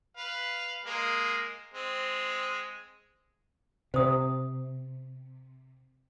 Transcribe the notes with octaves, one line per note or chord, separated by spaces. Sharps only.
B4 F5
G#3 A#3
G#3 C4
C3 C5 D#6